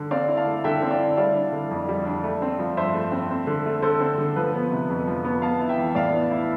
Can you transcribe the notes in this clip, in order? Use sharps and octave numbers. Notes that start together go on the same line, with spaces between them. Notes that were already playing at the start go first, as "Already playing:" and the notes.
Already playing: D3
C4 D5 F5
E4
F5 A5
A3
D3 E5 G5
C4
D5 F5
E4
G3 D5 F5
D4
D3
F2
G3
D4
A3
C4
F3
G2 C5 E5
A3
C4
C4
D3
A3
D3 A4 C5
C4
D3
F3 B4
B3
C3
F2
F3
B3
B3 F5 A5
E4
E5 G5
E3
A2 D5 F5
B3
E4